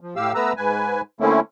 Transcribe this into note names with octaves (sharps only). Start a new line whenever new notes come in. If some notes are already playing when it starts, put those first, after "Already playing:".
F3
A2 G4 F5 E6
A3 B3 B4 A#5 E6
G#2 B4 G#5
D3 A3 A#3 C4 C#4 E4